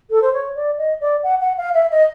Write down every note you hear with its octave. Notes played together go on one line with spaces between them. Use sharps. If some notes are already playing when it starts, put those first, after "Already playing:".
A4
C5
C#5
D5
D#5
D5
F#5
F#5
F5
E5
D#5